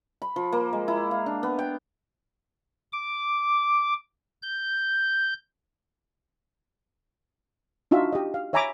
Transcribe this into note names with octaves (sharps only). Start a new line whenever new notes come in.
B5
F3
A#3
G#3
E4
F5
D4
B3
G5
D6
G6
D4 D#4 F4 F#4 E5
G4 D#5
F5
C#5 E5 G#5 A#5 B5 D6